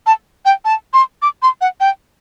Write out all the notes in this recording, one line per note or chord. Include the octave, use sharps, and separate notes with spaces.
A5
G5
A5
C6
D6
C6
F#5
G5